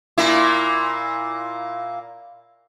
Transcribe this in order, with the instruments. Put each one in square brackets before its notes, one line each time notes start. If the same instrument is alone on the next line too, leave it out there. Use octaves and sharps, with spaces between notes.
[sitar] A#2 A#3 E4